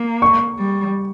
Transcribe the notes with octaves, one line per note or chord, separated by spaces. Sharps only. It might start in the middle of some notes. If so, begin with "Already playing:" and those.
Already playing: A#3
C#6
G3